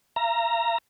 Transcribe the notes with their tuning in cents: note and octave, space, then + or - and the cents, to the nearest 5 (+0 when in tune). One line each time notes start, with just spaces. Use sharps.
F5 -45 A#5 +0